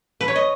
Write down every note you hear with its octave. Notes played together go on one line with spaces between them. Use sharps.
B4
C#5
D#5